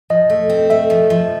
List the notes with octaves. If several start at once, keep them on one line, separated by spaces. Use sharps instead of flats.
F3 D#5
A3
C4
A3 E5
F3
F3